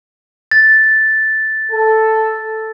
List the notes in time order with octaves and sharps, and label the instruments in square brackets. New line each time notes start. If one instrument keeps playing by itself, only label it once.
[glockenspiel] A6
[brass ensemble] A4